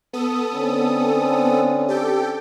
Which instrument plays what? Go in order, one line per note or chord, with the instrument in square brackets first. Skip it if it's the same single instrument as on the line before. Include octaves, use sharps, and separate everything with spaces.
[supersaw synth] B3 A4 D#6
[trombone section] D3 C4 C#4
[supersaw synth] G4 A4 G5